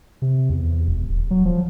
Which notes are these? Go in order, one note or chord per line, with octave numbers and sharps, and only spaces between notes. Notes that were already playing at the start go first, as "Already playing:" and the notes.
C3
E2
E1
D1
F#3
F3